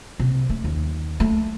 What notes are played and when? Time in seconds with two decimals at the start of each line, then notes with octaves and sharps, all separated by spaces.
0.19 C3
0.49 A3
0.64 D#2
1.20 A3